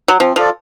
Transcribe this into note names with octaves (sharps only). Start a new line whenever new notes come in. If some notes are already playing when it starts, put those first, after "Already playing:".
F#3
F3 C4
F3 F4 A4 D5